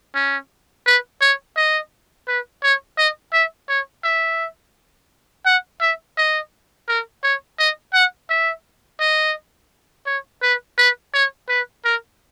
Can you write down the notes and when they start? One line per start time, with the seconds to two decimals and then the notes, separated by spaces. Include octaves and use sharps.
0.15 C#4
0.86 B4
1.21 C#5
1.57 D#5
2.28 B4
2.63 C#5
2.98 D#5
3.33 E5
3.69 C#5
4.04 E5
5.46 F#5
5.81 E5
6.17 D#5
6.88 A#4
7.23 C#5
7.59 D#5
7.94 F#5
8.30 E5
9.00 D#5
10.07 C#5
10.43 B4
10.78 B4
11.14 C#5
11.49 B4
11.85 A#4